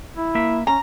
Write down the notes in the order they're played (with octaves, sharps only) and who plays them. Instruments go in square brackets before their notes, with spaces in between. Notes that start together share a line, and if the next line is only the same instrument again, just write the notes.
[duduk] E4
[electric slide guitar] A#3 E5
[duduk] C#4 [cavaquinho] A#5